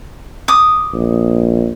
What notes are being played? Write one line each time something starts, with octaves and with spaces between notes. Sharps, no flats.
D6 D#6
A#1